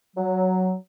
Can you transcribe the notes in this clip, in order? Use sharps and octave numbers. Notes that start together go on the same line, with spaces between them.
F#3